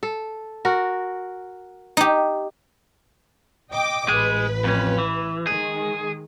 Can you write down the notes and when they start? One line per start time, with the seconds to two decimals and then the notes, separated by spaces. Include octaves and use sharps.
0.03 A4
0.65 F#4 A#4
1.97 D#4 G4
3.71 D#5 G5 D6
4.08 A1 G#3 G#4 B4
4.64 F2 C#4
4.98 E3
5.47 D#3 G#3 G#4